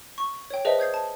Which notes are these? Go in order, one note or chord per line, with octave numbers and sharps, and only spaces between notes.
C#6
C#5 G5
G#4 B4 C5 D#5 E5 A5
D#6 G6 G#6 C7
A5